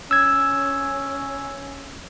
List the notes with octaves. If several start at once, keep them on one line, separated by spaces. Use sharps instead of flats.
C#4 E6 G#6